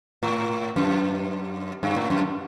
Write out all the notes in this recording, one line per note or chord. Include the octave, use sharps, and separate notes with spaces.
A2
F#2
G2
A2
F#2